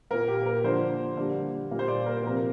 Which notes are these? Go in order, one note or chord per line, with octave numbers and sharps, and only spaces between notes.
A#2 A#3 A#4
G4
A#4
D3 F3 A#3 C5
D3 G3 A#3
A#2 G3 A#3
C5
D5
A#4
C5
C3 F3 A#3 A#4